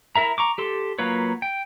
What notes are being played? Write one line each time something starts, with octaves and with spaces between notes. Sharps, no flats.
E4 A#4 E5 A#5
A#5 C#6 D6
G4 A4 C6
F#3 A#3 F4 B4 C#5
G5